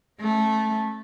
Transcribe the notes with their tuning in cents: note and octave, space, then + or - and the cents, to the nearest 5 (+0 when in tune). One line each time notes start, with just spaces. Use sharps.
A3 -10 C#4 -25